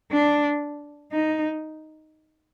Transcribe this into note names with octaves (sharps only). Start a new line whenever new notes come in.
D4
D#4